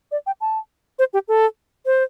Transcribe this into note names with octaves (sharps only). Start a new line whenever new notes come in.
D5
G5
A5
C5
G4
A4
C5